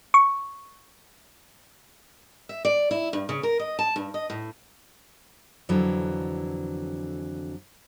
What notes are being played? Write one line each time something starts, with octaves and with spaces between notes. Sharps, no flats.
C#6
E5
D5
E4
G2
C#3
A#4
D#5
A5
G2
D#5
A2
F2 D3 E3 F#3